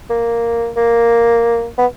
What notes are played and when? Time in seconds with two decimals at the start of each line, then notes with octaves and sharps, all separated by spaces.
0.10 A#3
0.77 A#3
1.78 B3